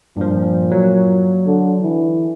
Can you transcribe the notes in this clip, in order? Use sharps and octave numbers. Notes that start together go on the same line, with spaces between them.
G2 A#2 F3
F#3
D3
E3